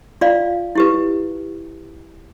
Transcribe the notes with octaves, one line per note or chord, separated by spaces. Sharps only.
F4 D5 F5
E4 G4 B4